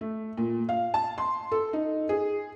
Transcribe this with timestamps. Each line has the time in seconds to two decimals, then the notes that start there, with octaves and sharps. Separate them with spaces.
0.01 A3
0.37 A#2
0.69 F5
0.94 A5
1.18 C6
1.52 A4
1.73 D#4
2.09 G#4